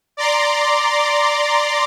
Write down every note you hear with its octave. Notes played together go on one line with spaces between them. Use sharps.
D5 A#5 C6 D6